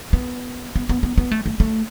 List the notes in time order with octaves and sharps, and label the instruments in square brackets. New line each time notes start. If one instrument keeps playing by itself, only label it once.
[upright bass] B3
B3
B3
B3
B3
A3
A3
A3